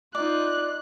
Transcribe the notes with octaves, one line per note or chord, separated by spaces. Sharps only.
D#4 F4 D5 F#6